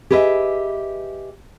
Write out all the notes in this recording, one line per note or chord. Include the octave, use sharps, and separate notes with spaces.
G4 G#4 B4 D#5 E5